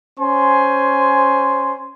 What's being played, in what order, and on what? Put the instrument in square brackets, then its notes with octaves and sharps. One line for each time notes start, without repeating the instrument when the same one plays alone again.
[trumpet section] C#4 C5 G#5 C6